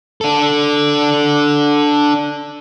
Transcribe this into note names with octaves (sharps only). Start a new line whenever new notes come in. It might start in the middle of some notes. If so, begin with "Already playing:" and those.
D4 A4